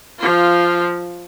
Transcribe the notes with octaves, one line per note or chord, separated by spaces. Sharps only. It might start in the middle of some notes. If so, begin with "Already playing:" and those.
F3 F4